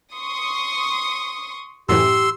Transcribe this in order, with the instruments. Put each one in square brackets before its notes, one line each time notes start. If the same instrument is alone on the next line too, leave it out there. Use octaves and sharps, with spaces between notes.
[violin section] C6 C#6 D#6
[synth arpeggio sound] F#2 A2 E3 [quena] G4 [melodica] C6 E6